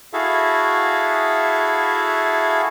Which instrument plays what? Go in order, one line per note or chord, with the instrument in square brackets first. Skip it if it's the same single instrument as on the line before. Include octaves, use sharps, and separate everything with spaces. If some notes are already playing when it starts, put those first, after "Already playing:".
[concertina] E4 F#4 G#4 A4 E5 F5